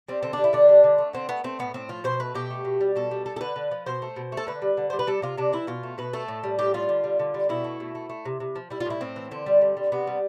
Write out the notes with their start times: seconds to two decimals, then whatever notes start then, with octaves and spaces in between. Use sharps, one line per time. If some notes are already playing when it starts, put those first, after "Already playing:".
0.08 G3 C4
0.23 D3 C4
0.33 D4
0.38 G3
0.44 E4
0.53 D3 D4
0.69 G3
0.84 D3
0.98 A3
1.13 D3 C4
1.29 A3 B3
1.44 A3 C4
1.59 A2 B3
1.74 A2 C4
1.89 F3 F4
2.04 B2 C5
2.20 A3 B4
2.35 B2 G4
2.50 A3
2.65 B2
2.81 G3
2.96 B2 A4
3.11 G3
3.26 A3 A4
3.36 A4
3.41 D3 B4
3.56 D3
3.71 F3
3.86 B2 C5
4.02 A3
4.16 B2
4.32 A3
4.37 A4
4.47 D3 B4
4.62 G3
4.77 D3
4.90 G3 C5
4.99 B4
5.07 G3 A4
5.22 C3 F4
5.38 C3 D4
5.53 E3 E4
5.67 B2 F4
5.83 A3
5.98 B2 B4
6.13 A3 A4
6.28 A2
6.44 G3
6.59 A2 G4
6.74 G3 F4
6.89 D3
7.04 G3
7.19 D3
7.34 G3
7.49 B2 E4
7.64 A3
7.80 B2
7.95 A3
8.09 A3
8.25 C3
8.40 C3
8.56 F3
8.71 G3 E4
8.80 F4
8.85 A2 E4
9.01 A2 C4
9.16 E3
9.31 D3 C4
9.46 G3
9.61 D3
9.77 G3
9.92 C3 B3
10.07 G3